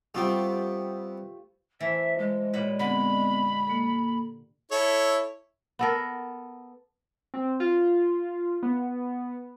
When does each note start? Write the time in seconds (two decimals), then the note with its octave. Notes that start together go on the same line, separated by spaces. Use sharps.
0.14 G3 A3 B3 C4 F4 G4
1.81 E3 A3 C5 E5
2.18 G#3
2.54 A#2 G3 B4 C#5
2.79 D3 B3 C4 B5
3.67 A#3 A4
4.72 E4 A4 C#5
5.79 B3 A4 A#4
7.34 C4
7.60 F4
8.63 B3